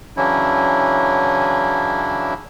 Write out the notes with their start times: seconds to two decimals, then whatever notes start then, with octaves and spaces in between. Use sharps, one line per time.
0.17 C#3 E3 F#3 C#4 D4 E4